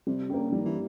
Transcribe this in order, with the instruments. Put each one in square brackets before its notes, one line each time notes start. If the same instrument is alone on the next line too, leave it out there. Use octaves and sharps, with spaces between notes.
[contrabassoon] C3 [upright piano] G3
[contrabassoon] C#3 [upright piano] A#3 D4 G4
[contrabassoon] D#3 [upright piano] G3
[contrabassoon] E3